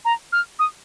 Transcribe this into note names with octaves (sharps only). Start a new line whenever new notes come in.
A#5
F6
D#6